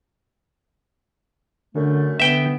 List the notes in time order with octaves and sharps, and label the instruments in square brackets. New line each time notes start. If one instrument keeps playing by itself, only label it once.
[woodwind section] F#2 A3 [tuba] D3
[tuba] D3 [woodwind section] B3 [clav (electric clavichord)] E5 G5